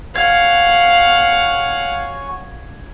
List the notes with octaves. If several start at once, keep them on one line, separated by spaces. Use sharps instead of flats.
F#4 C#5 F5 F#5 G#5 G#6